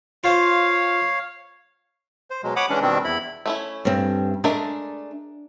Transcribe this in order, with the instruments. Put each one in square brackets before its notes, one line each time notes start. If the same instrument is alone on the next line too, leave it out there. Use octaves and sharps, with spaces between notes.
[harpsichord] F4 C5 [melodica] C#5 F5
[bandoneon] C5
B2 F#3 G#3
C#5 F#5 B5 D6 D#6
E3 G#3 C#4 D4
B2 D#3 G3 C4 D4
E2 E4 B5
[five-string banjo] A3 C#4 E4
[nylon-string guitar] G2 C4
[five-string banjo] G#3 A3 A#4 [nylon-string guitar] D4